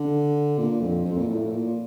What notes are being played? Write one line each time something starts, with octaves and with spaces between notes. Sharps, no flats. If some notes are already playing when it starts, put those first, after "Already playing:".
Already playing: D3
A#2
F2
F2
A#2
A2
A2
A#2